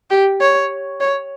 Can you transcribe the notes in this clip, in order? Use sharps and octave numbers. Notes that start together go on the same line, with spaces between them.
G4
C#5
C#5